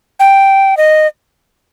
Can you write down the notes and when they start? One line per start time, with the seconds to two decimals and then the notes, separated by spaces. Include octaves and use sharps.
0.19 G5
0.77 D#5